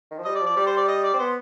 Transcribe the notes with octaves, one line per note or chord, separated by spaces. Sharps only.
D#3
F3
G3 D#5
D5
F3
D5
G3 D5
C5
D5
D#5
D5
C4
B3 C5